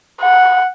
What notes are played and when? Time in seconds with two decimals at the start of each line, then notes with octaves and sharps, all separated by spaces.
0.21 F#5